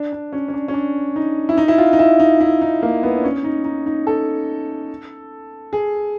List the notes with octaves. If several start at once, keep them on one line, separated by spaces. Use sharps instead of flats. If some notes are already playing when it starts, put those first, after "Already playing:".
Already playing: D4
D4
C#4
C#4
D4
C#4
D4
D#4
E4
D#4
E4
F4
D#4
E4
D#4
E4
D#4
A#3
B3
D4
C#4
D#4
D#4
D#4
A4
G#4